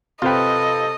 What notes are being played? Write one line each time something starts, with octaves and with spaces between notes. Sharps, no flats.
C3 F4 A4 B4 C5 D#5 G5